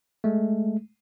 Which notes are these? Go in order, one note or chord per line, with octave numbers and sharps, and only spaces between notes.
G#3 A3